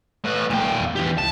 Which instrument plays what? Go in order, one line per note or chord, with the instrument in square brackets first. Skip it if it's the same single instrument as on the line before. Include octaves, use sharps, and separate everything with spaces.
[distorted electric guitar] A2 B4
[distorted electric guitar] A#2 G5 [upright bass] E3 A3
[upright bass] F#3
E2
[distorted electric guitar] E3 G4
[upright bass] C#2 [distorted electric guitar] A5